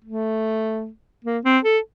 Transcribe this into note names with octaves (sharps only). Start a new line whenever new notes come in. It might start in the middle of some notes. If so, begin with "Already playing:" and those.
A3
A#3
C4
A4